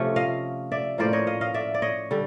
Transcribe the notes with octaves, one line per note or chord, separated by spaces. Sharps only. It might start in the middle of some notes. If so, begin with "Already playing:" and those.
Already playing: C3 F3 A3 C#4
D#5 F5
D5 E5
A2 F3 A#3 C#4 C5 D5
C#5 D#5
D#5 F5
D#5 F5
D5 E5
D5
C#5 D#5
D3 G3